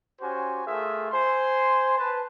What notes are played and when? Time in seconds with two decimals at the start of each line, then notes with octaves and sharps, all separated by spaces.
0.21 C#4 F#4 G4 C5 G#5
0.65 A3 F4 G#4 A#4 E5
1.11 C5 G#5 C6
1.97 B4 A5